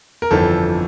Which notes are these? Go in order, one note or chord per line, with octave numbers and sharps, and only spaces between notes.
A#4
G1 F2 E3 A4